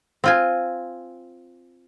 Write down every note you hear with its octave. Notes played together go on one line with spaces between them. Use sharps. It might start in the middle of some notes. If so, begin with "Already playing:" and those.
C4 F4 G#5